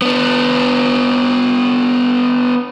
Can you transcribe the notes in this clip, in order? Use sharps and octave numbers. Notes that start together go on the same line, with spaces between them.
B3 D4